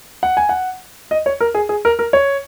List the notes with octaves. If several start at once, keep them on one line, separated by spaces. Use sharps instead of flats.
F#5
G#5
F#5
D#5
C#5
A#4
G#4
G#4
A#4
A#4
C#5